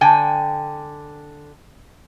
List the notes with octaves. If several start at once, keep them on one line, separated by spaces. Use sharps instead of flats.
D3 G5 G#5